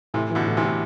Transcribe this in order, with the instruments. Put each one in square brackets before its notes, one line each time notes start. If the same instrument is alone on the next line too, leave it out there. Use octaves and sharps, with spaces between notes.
[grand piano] A2 [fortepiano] C3 E3
[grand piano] E3
[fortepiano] B2 D3
[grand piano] A2
[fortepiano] C3 E3
[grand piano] A2